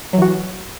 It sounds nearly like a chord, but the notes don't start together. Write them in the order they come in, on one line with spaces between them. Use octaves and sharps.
F#3 E3 F#4